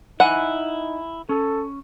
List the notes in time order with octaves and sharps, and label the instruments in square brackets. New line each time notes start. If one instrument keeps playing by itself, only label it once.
[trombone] D#4 [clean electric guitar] E4 G#5 [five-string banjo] F#5
[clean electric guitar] C#4 [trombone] A4